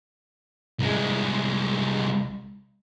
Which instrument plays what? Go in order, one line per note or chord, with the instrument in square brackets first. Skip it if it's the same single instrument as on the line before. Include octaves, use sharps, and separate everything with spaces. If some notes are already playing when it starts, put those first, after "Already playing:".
[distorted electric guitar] C2 G#3